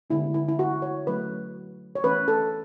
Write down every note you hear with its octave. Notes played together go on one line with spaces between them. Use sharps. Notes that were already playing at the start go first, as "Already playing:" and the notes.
D3 G#3 B3 E4
E4
E4
F#4
C#5
F#3 A3 C#4 B4
C#5
E3 A3 C#4 B4
A4